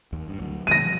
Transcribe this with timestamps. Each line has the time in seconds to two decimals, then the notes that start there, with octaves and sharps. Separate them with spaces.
0.13 D#2
0.28 G2
0.40 D2 F#3
0.67 D#3 G#3 A#6 D#7
0.82 B2 F3 G3